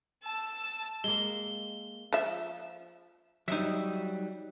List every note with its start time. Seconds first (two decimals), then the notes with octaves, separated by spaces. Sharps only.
0.24 A5 E6
1.04 G#3 A#3 G7
2.13 F3 E5
3.48 F#3 G3 D#4 E5